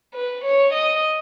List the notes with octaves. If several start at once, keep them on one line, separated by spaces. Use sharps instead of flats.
B4
C#5
D#5